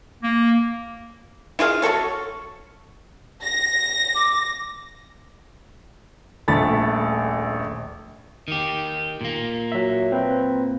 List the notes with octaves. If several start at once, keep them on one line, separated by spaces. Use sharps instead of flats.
A#3
E4 F4 G#4 F5
F#3 F#4 A4 C#5
A#6
D6
D#1 A#1 A3 B5 A6
D#3 G4
A#2 A#3
F#3 E5
C4 B4